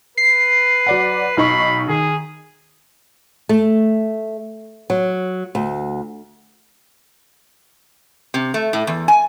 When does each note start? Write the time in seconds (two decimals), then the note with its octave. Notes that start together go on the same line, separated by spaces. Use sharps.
0.18 B4 C7
0.86 F#3 D5 F#5
1.37 B1 D#4 B5 C#6
1.88 D#3 G#4
3.49 A3
4.90 F#3
5.55 D2
8.34 C3
8.54 A3
8.73 A2
8.87 E2
9.08 G#5